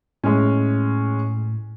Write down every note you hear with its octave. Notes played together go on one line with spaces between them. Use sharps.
A2 G#3 C#4